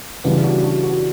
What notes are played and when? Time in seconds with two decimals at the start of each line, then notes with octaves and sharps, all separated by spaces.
0.24 C#3 E3 G3 B3 D4
0.44 D4 F#4
0.64 D4 F#4
0.84 D4 F#4